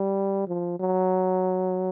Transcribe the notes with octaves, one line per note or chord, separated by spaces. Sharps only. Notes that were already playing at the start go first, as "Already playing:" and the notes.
Already playing: G3
F3
F#3